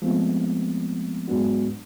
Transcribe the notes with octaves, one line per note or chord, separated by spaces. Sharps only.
F3 G#3 A3 B3 C4
G#2 F#3 G#3 B3 D4 F#4